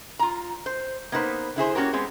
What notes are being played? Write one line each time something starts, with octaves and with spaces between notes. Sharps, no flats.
F4 A#5
C5
A#3 B3 D#4 B4 C5
D3 E4 G#4 C5
A#3 C#4 F#4 G4 A#4
G#3 B3 C4